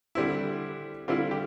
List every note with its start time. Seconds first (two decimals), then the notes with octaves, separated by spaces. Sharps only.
0.15 D3 G3 C4 E4
1.08 D3 G3 C4 E4 F4
1.31 G4